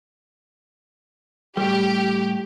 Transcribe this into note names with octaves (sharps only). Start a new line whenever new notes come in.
A2 G3 G4